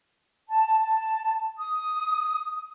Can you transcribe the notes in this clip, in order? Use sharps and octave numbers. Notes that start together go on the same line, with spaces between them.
A5
A5
D#6